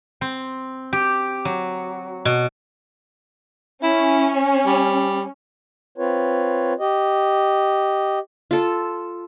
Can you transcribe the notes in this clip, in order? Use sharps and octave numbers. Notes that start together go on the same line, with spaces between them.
C4
G4
F#3
B2
C#4 E4
G3
C4 F4 B4 C#5
G4 D#5
F4 A4